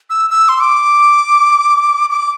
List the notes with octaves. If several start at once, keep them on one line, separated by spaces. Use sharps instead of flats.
E6
E6
C6
D6
D6